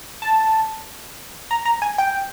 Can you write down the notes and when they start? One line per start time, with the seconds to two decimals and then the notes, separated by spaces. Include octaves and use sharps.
0.22 A5
1.51 A#5
1.65 A#5
1.82 G#5
1.98 G5